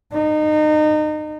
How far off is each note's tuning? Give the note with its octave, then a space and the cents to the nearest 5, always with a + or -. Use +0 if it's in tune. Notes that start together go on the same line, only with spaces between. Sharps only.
D#4 -30